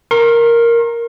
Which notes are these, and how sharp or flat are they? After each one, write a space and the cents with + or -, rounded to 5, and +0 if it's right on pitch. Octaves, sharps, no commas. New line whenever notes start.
A#4 +0 C6 +45